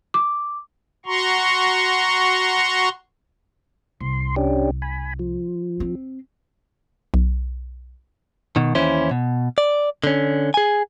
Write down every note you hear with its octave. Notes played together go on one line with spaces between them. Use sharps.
D6
F#4 A#5 C6 C#6
C2 C6
C#4 D4 G4
G#5 B5
F3
C4
B1
B2 D#3
D#2 E3 C#4 E4 C5
B2
D5
D3 C#4
G#4 G#5